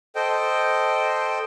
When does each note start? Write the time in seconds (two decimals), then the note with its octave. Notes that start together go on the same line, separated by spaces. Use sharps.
0.15 A4 C5 D#5 G5